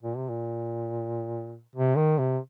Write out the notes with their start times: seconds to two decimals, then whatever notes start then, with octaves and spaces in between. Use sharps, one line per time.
0.03 A#2
0.17 C3
0.29 A#2
1.76 C3
1.97 D#3
2.19 C3